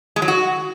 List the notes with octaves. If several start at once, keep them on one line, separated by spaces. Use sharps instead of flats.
G#3
F#3
F#4